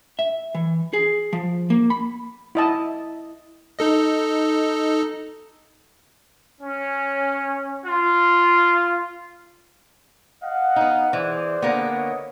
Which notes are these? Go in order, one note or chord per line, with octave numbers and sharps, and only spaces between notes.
E5
E3
G#4
F3
A#3
B5
E4 D#5 A5
D#4 A4 D#5
C#4
F4
D#5 F5 F#5
B3 D#4
E3 G#4 C5 D5
D3 A#3 B3
C#5 D#5